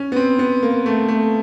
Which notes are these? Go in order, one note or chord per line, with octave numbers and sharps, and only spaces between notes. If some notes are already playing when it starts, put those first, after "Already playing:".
Already playing: C#4
B3
C4
B3
A#3
A3
A3